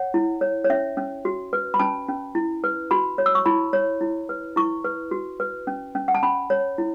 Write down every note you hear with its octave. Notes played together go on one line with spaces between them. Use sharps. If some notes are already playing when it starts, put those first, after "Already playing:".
Already playing: C#5 F#5
E4
C#5
C#5
C#4 E5
C#4
F#4
B4
B5
C#4 A5
C#4
E4
B4
F#4 B5
C#5
E6
C#6
E4 B5
C#5
E4
B4
E4 C#6
B4
F#4
B4
C#4
C#4
F#5
A5
C#4 B5
C#5
E4